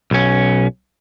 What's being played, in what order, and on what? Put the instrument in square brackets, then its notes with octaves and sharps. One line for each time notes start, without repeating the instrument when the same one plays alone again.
[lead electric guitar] B1 C#4